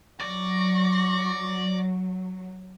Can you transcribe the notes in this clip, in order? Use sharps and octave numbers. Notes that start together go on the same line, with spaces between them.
F#3 D5 C#6 A#6